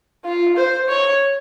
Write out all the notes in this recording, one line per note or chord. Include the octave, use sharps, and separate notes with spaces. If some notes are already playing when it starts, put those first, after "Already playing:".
F4
C5
C#5